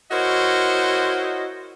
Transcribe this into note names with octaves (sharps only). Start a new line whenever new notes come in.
E4 F#4 A#4 C5 C#5 D#5